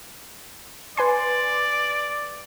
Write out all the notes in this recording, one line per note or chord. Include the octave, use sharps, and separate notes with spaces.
B4 D5 G#5 C6